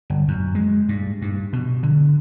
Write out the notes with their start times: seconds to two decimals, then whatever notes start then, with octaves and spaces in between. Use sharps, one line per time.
0.10 G1
0.28 F#2
0.55 G#3
0.89 G2
1.22 G2
1.53 B2
1.83 D3